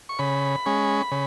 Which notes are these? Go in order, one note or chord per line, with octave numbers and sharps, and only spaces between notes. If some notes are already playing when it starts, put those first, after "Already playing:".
C#6
C#3 B5
G#3 C#4
C#3